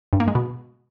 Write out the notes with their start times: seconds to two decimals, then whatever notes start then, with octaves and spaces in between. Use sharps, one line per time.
0.13 G2
0.20 A#3
0.28 G#3
0.35 B2